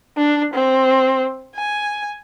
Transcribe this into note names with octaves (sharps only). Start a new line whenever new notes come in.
D4
C4
G#5